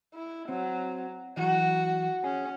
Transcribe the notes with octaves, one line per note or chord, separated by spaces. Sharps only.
E4
F#3 C4
E3 F#3 F#4
C#4 G#4